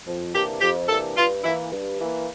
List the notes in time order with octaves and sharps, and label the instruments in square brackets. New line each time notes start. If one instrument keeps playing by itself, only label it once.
[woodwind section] F2
[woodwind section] C3 E3 A#3 D4 [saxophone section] G4
[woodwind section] F2 [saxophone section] G4
[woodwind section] C3 E3 A#3 D4 [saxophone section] A4
[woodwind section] G2 [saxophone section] F4
[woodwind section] E3 A#3 [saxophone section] E4
[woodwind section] G2
E3 A#3